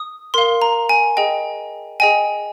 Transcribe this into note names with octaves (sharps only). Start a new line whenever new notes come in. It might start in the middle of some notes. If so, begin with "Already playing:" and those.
Already playing: D#6
A#4 F5 C6
A#5
G#5
G#4 D#5 G5
G#4 D#5 G5 G#5